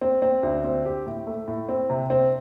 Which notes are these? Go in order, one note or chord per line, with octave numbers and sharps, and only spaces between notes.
C4
C4
D2
C4
G4
A2
A3
A2
C4
C3
C4